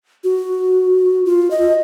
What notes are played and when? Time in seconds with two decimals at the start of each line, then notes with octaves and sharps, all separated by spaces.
0.24 F#4
1.26 F4
1.51 D#5